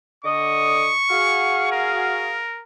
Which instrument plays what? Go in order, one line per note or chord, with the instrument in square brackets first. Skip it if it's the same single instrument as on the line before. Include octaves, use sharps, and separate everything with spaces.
[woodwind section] D3 D#5 D#6 [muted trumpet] C#6
[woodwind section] F#4 G#4 F5
[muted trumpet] A#4